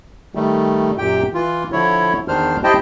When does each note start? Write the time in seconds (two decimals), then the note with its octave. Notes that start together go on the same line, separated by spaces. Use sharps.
0.35 D#3 G3 A3
0.98 F#2 A#2 G4 G5
1.34 E3 F4
1.72 D3 F3 E4 C#5
2.28 E2 D#3 D4 C5 F6
2.64 E4 G4 C5 D#5 G5 A5